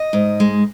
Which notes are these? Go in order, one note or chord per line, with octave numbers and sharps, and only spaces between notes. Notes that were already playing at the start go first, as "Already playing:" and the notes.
Already playing: D#5
G#2
G#3